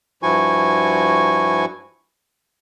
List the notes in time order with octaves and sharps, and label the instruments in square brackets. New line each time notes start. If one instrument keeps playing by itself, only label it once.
[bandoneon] G2 F3 E4 F#4 G#5 C#6